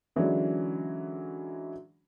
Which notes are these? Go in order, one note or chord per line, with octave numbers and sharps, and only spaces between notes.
D3 E3 F#3 G#3 C#4 D4